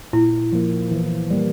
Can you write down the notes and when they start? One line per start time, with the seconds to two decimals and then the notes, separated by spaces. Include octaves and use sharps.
0.13 A#2 E4
0.52 F3 A#3
0.91 E3
1.31 G3 A#3